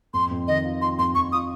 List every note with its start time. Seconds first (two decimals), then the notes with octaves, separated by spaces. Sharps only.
0.14 F2 C6
0.31 F2
0.48 D#3 D#5
0.65 F4
0.82 F4 C6
0.99 F2 C6
1.15 F2 C#6
1.32 F4 D#6